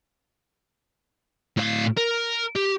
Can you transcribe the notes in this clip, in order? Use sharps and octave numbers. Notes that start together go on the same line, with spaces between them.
A2 F5
A#4
G4